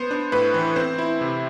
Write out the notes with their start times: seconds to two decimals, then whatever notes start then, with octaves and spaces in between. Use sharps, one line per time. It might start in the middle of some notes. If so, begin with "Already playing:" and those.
Already playing: B3 C5
0.11 D4
0.32 A2 B4
0.54 E3
0.76 C4 C5
0.98 E4
1.21 C3